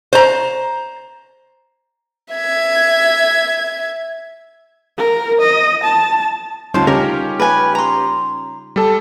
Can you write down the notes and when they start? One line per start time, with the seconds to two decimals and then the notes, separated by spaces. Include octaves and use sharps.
0.13 C5 A#5
2.32 E5 G#6
4.98 A#4
5.41 D#5
5.84 A5
6.74 D2 G3 C#4 D#4 F4 C5 A5
6.87 C#3 C#4 G4 A#4
7.40 B4 G#5
7.75 A#5 C6
8.76 G3 A4 A5